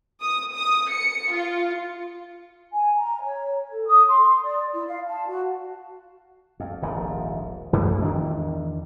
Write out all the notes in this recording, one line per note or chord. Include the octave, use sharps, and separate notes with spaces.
D#6
D#6
C#7
F4
G#5
A#5
C#5
A4
D#6
C6
D5
E4
F5
A5
F#4
F2
D#1 A#1 G#2
F#2 A2
E2 D#3 D4